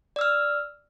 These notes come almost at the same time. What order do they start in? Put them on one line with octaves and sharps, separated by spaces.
D5 E6 F6